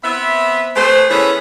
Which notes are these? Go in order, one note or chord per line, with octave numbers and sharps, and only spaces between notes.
B3 C4 E5
A3 G#4 B4 C5
E3 B3 C#4 G#4 A4 B4